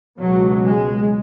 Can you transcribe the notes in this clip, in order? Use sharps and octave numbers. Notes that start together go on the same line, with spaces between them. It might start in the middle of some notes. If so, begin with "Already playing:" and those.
C#2 B2 F#3
G#3